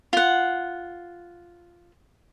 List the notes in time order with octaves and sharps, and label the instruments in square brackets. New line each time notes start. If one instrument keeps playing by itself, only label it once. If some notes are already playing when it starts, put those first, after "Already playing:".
[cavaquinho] F4 F#5